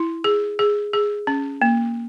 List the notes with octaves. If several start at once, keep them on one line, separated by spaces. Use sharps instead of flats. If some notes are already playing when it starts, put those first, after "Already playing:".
Already playing: E4
G#4
G#4
G#4
C#4
A#3